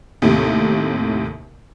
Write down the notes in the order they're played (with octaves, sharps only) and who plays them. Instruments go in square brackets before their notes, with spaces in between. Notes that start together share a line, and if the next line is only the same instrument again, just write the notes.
[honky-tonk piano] D#2 A2 C3